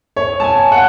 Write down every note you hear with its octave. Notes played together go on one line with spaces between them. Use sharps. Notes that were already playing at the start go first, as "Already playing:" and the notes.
C#5
A5
G#5
F#5